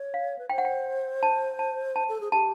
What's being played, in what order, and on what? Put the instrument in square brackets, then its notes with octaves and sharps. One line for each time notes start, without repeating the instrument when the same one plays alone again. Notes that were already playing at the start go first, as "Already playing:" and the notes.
Already playing: [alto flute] C#5
[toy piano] F5
[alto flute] B4
[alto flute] C5 [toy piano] G5
[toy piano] F#5
G5
A5
A5
A5
[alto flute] A4
G#4
[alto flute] G4 [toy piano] A5